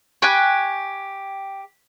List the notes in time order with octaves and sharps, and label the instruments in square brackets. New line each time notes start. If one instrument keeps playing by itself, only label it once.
[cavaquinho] G4 C#6 [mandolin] G5 G#5 F#6